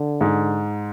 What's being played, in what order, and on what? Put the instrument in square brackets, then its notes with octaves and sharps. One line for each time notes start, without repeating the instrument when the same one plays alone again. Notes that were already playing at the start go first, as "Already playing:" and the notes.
Already playing: [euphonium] D3
[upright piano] G#2